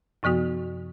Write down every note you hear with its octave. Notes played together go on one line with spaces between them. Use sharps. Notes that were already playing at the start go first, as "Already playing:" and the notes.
F#2 C3 F3 B3 F#4